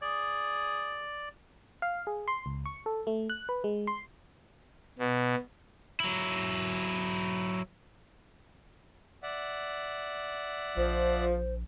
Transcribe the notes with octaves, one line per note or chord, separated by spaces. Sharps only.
G#4 D5
F5
G#4
C6
C#2
C#6
A4
A3
F#6
B4
G#3
C6
B2
F#3 E4
D5 E5 F#5
A#1 F3 C5